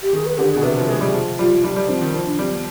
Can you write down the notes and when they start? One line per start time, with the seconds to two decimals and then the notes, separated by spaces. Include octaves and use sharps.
0.02 G4
0.13 D#3 G#4
0.25 B4
0.38 D3 G4
0.50 G#4
0.56 B2
0.63 C3 B4
0.76 F3
0.88 G#3 G#4
1.01 G3
1.14 F3
1.39 G3 F4
1.64 G3 D#4
1.76 G3
1.88 F3 C4
2.01 D#3
2.14 F3 D#4
2.26 D4
2.39 G3 C4
2.52 B3